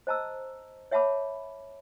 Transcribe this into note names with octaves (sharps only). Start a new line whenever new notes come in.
C5 D#5 A5 A#5 E6
C#5 E5 F#5 A5 B5 D6